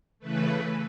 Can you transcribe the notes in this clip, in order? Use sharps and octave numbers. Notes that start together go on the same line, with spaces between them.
C#3 E3 A3 B4